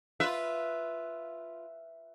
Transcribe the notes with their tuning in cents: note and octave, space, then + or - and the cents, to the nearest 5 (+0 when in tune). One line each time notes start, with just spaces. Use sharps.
F4 -5 B4 +0 E5 +0